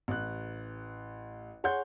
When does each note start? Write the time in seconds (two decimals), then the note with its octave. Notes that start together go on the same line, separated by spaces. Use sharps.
0.08 A1 F#6
1.64 G#4 C#5 F#5 C6 G6